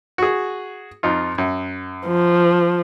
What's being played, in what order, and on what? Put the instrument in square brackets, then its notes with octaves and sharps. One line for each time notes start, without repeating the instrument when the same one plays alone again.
[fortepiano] F#4 G#4
F2 D#4 F4
F#2
[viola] F3